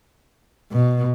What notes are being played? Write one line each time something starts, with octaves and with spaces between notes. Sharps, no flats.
B2